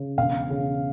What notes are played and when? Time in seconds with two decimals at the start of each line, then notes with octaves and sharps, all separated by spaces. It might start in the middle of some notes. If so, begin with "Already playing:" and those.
Already playing: C#3
0.17 E1 F5
0.49 C#3